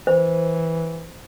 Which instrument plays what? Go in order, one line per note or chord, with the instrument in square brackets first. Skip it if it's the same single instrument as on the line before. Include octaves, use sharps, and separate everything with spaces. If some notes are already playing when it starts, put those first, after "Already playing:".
[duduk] E3 [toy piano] C5